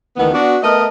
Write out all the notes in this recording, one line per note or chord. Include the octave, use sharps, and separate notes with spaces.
D2 D#3 E3 B3
B3 D4 F#4
A3 B3 A#4 D#5